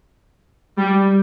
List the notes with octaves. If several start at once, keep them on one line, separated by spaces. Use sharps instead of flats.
G3